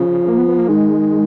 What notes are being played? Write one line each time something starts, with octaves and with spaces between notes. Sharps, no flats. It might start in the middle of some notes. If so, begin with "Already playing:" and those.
Already playing: C#3 F3
A#3
B3
B3
A#3
D#3 G#3